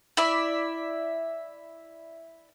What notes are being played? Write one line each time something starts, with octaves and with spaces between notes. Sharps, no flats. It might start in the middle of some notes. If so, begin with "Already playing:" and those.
E4 D5 E5